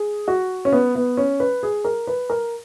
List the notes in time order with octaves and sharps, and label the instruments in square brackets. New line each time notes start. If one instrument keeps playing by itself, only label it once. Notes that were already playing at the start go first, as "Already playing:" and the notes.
Already playing: [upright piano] G#4
F#4
C#4
B3
B3
C#4
B4
G#4
A#4
B4
A#4